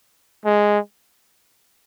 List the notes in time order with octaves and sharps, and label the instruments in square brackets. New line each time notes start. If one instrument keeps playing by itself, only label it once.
[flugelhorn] G#3